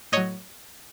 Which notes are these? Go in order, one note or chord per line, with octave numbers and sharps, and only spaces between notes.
A2 F#3 C#5 D#5